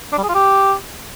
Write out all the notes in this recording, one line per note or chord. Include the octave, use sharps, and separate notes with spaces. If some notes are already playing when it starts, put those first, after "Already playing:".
D4
G3
G#4
F4
G4